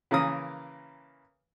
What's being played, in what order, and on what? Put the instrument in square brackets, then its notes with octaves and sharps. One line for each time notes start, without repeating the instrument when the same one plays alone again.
[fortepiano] C#3 E3 A#3 A#4 B4 D#6